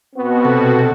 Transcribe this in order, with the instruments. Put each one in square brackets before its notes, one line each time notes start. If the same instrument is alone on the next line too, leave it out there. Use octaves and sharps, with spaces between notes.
[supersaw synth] B2 F#4 [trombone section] B3 C4
[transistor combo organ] C3 A4